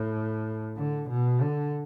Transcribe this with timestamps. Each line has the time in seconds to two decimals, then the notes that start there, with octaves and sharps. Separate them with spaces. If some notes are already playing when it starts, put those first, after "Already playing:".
Already playing: A2
0.76 D3
1.09 B2
1.41 D3